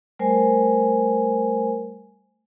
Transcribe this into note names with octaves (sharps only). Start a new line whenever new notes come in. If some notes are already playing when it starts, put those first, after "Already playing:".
G3 A3 A#4 C5 G#5